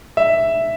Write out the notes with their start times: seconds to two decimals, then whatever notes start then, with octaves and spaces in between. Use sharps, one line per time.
0.17 E5